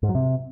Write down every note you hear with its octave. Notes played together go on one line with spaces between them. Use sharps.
G#2
F#3
C3